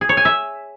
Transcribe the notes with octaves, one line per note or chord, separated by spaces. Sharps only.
G#4
C#5
G#5
E5